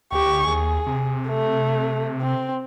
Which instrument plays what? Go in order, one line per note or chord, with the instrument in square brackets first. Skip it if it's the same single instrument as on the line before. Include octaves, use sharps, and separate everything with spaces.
[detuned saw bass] D2 [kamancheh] G4 C#6
[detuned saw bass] D#2 [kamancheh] G#4
[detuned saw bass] C3
[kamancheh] A3
C4